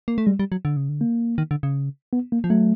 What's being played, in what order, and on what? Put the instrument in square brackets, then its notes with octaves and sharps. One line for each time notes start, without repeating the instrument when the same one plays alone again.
[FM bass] A#3
A3
[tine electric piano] G3 [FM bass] G#3
[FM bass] G3
F#3
D3
C#3
D3
[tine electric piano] A#3
[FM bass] D#3
D3
C#3
[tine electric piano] B3
A#3
[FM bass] F3
[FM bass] F#3 [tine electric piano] A3